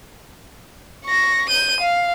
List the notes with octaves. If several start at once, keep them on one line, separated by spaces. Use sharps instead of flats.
C#6 A#6
G6 D#7
F5